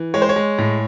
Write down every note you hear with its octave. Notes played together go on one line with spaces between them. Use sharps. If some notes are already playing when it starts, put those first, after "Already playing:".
Already playing: E3
G#3 C#5
C5
C#5
G#3
A2